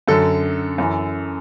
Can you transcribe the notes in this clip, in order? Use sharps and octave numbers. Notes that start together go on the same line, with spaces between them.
F#2 D3 F#3 A4
F#2 E3